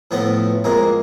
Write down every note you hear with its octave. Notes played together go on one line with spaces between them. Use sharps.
A2 F3 A3 B3
F2 G#3 A#3